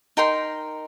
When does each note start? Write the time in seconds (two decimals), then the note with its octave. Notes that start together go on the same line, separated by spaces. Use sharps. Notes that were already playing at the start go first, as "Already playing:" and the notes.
0.17 D#4 A#4 G5 C6